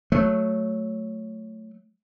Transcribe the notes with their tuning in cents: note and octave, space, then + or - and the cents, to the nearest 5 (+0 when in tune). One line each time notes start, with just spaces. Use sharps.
F#3 +0 A3 +0